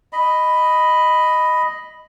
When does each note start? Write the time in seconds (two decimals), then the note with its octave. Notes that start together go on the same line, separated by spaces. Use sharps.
0.13 D#5 B5